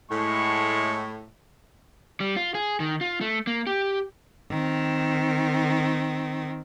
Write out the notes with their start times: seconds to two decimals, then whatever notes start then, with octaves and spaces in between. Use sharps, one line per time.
0.11 A2 G#3 C#6
2.20 G3
2.36 F4
2.55 G#4
2.80 D#3
3.01 F4
3.21 A3
3.47 A#3
3.67 G4
4.50 D#3 C4